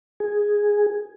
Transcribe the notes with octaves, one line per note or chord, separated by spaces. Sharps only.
G#4